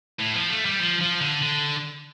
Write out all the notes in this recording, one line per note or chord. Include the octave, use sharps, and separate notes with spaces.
A2
F3
A3
G3
F3
F3
D3
D3